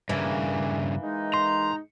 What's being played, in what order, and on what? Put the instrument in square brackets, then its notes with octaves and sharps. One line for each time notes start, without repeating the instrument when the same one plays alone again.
[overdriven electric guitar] G2 C#3 [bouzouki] E3 A#3
[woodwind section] G#3 D#4
[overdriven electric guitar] A#5 [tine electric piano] C6